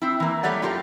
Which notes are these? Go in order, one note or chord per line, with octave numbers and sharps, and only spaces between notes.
C4 E4
E3 A#3
G3 A3 G4 C#5 D5 F#5
F#2 F4 G4 A#4